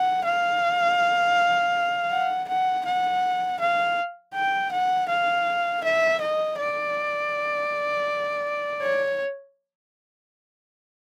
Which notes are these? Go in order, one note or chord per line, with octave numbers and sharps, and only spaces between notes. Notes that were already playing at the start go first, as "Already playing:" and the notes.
Already playing: F#5
F5
F#5
F#5
F#5
F5
G5
F#5
F5
E5
D#5
D5
C#5